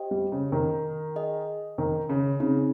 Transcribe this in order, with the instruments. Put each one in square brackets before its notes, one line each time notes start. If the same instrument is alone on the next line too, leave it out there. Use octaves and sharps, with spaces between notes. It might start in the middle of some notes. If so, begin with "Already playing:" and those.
Already playing: [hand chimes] G4 C5 D#5 G5
[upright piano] G3
C#3
D#3
[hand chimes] G#4 D#5 G#5
[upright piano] D#3
C#3
[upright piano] C#3 [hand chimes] C4 D#4 G#4